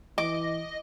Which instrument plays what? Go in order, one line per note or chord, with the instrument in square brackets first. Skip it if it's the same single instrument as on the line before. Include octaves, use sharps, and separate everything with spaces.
[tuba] E3 [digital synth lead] D#5 [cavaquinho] D6